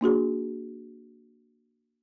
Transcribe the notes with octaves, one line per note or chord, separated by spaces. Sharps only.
A#3 D4 F#4 G#4